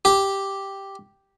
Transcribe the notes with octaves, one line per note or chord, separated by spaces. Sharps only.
G4